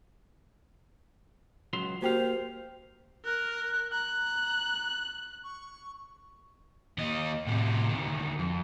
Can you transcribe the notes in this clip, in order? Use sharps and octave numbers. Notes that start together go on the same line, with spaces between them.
C#2 F#3 C6
A#3 F#4 G4 C5 F5 G5
A#4 F#6
A#5 F#6
C#6
D#2 D#5
A2 C3
D2 D#3
F2